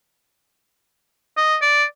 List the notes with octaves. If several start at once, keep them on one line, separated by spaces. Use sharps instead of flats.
D#5
D5